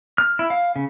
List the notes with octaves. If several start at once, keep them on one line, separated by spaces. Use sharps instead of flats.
F6
E4
F5
C#3